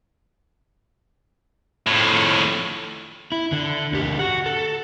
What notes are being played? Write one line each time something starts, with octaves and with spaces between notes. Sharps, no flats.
F2 A2
E4
D3
D2 G4
F#4 F#5
A4